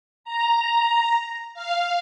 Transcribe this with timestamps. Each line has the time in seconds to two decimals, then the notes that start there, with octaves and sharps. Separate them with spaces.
0.24 A#5
1.54 F5